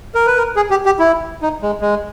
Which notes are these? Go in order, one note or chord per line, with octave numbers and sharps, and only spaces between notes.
A#4
B4
A#4
G#4
G4
G4
E4
D#4
G#3
G#3